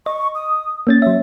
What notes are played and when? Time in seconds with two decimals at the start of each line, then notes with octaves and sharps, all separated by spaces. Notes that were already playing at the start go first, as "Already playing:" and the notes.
0.06 D#5 C#6
0.35 D#6
0.87 A#3 C#4 A6
1.02 F#3 C#5 E5